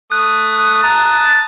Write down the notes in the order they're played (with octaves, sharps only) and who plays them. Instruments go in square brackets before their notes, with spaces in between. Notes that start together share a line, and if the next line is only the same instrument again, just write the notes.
[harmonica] A3 D#6 [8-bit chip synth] F#6
[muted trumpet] A5 [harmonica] A#5 D#6